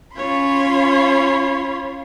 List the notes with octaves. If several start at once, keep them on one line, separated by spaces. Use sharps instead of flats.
C#4 F4 C#5 B5 C6